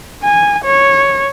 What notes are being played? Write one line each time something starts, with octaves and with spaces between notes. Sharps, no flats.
G#5
C#5